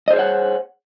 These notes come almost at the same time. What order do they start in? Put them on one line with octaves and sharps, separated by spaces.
D#5 C5 G#4 C#5 F#5